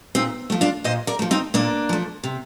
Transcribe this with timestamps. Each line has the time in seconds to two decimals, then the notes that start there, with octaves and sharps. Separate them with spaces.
0.15 A#2 C4 D#4
0.50 F3 A3
0.61 D4 F4
0.84 A#2 C5 D#5
1.07 A#4 D5
1.19 F3 A3
1.31 C4 D#4
1.54 A#2 A#3 D4
1.89 F3 A3
2.24 C3